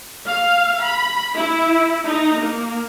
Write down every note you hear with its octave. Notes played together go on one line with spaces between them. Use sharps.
F5
B5
E4
D#4
A#3